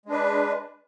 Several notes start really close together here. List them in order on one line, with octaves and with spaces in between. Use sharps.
G#3 D4 B4